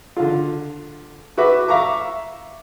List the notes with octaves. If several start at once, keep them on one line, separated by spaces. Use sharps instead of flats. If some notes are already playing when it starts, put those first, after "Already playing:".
D3 F4
F#4 B4 E5 D6
E5 F5 A#5 C#6 D6